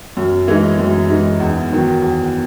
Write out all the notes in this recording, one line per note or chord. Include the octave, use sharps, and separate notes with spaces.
F#2
E3 G#3 D#4
F#2
E3 G#3 D#4
E2
D#3 F#3
E2